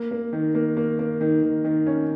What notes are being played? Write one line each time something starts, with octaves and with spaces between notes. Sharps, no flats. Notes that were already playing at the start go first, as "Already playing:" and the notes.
Already playing: A#3
A#3
D#3
A#3
A#3
A#3
D#3
D#3
D#3
C#4